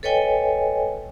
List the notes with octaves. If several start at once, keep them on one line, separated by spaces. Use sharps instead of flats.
A4 B4 C#5 D#5 G5 G#5